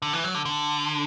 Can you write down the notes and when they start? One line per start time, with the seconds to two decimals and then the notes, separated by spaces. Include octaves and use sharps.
0.02 D3
0.13 E3
0.24 F#3
0.35 D3
0.45 D3